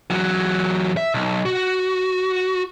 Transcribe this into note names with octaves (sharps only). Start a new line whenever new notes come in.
E2 F#3
E5
B1
F#4